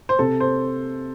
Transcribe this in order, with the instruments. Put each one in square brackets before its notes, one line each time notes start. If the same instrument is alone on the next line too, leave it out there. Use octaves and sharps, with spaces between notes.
[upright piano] C5
[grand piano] C3 [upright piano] A4
[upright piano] C5